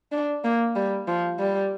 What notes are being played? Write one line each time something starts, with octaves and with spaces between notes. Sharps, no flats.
D4
A#3
G3
F3
G3